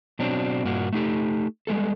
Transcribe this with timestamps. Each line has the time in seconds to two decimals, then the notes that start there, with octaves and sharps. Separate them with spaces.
0.19 B2 F#3 C4 D4
0.64 G2 A#2 A#3 F#4
0.93 A3 D#4 G4 A4
1.67 G3 G#3 B3 A4